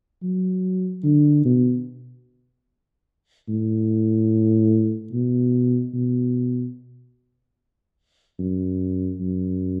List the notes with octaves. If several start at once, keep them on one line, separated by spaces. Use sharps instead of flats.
F#3
D3
B2
A2
B2
B2
F#2
F#2